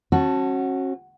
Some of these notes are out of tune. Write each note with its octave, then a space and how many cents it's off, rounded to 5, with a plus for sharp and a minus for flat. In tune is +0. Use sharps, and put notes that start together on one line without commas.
C#4 -40 F#4 +0 A5 +0